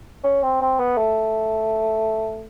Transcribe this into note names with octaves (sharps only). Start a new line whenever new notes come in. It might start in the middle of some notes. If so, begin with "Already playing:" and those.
C#4
C4
C4
B3
A3